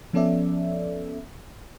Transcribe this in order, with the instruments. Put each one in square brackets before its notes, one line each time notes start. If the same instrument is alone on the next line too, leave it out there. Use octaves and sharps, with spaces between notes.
[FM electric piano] F3 B3 C#4 A4 D5 E5